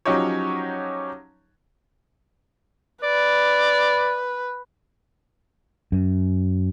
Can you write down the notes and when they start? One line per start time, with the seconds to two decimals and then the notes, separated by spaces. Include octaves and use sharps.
0.05 F3 F#3 C#4 D#4 G4 C#5
3.03 B4 D5
5.92 F#2